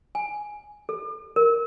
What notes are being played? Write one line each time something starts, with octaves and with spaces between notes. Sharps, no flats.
G#5
A4
A#4